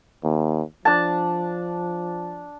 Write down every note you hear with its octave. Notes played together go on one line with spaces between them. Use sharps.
D#2
F3 D4 A5